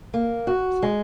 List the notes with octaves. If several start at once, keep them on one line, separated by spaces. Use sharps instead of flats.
A#3
F#4
G#3